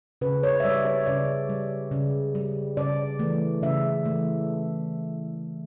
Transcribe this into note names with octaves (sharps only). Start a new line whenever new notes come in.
C#3 B4
C#5
E5
G3 D5
C#5
C#3 D5
G3
C#3
G3
C#3 D5
E3 A3
C#3 E5
E3 A3